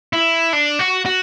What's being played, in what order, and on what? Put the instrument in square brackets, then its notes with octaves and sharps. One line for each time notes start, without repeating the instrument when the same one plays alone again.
[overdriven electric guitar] E4
D4
F#4
F#4